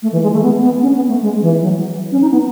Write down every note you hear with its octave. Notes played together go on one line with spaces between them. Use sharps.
A3
E3
G#3
A3
B3
B3
C#4
B3
A3
G#3
E3
F#3
C#4
D#4
B3